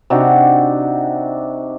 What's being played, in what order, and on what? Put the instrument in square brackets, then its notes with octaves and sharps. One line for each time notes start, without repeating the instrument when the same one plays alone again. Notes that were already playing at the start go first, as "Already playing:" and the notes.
[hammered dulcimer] C3 D4 D#4 F#4